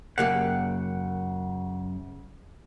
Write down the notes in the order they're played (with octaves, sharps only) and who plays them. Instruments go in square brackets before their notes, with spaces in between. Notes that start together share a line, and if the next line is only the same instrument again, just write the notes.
[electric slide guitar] F#2 F#5 [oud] C#3 A#3 G4